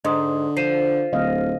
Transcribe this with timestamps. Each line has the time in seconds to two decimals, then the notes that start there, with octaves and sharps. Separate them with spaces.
0.05 G#2 D3 D#5 C6 D#6
0.57 F3 C7 D#7 E7
1.13 D1 D3 D#5 F5